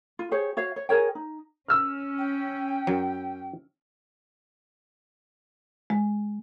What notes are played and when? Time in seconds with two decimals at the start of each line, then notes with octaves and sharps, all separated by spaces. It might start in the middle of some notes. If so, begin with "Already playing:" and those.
0.19 F4
0.31 G4 G#4 C5 C#5
0.57 F#4 C#5 F5
0.76 C#5
0.89 G#4 A#4 C#5 G5
1.15 D#4
1.68 C#4 E6 F6
2.18 G5
2.87 F#2 F#3
5.90 G#3